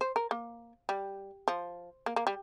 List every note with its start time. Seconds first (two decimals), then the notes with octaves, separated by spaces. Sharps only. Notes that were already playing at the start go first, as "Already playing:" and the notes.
0.01 C5
0.16 A#4
0.31 A#3
0.89 G3
1.48 F3
2.06 A#3
2.16 A#3
2.27 G3